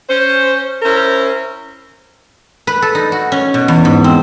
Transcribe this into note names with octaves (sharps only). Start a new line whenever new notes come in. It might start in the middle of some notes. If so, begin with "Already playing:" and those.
C#4 C5
C#4 E4 A#4 C5
B4
A4
D#4
F#4
C#4
B2
E2
G#2
C4